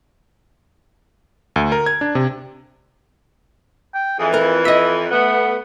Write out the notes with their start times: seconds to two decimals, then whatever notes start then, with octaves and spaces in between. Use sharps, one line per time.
1.56 D2
1.72 A#4
1.86 G#6
2.01 D4
2.15 C3
3.94 G5
4.19 F2 E3 G#4
4.34 A#4 B4
4.65 D#5 E5
5.11 A3 B3 F#5